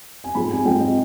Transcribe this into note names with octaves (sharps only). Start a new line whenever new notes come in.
G#5
G#2 F3 G#3 C4 B5
G#5
G#2 F3 G#3 C4 G5
D#5